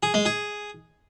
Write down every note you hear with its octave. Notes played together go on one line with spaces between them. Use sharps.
G#4
G#3
G#4